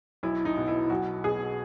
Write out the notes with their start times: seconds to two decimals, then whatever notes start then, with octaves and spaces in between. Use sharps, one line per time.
0.23 B1 E4
0.45 D#4
0.57 B2
0.68 E4
0.90 B1 F#4
1.24 B2 G#4